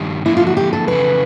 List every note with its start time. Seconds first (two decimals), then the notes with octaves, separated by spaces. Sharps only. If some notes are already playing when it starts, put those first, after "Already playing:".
Already playing: G2 D#3 G3
0.26 D3 F3 A#3 E4
0.37 F4
0.47 F#4
0.57 G4
0.73 A4
0.87 F2 C#3 E3 B4